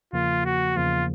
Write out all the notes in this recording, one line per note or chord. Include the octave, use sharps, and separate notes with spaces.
E2 C#3 F3 A#3 F4
F#4
E2 C#3 F3 A#3 F4